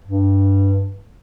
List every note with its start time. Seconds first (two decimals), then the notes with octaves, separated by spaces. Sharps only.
0.04 G2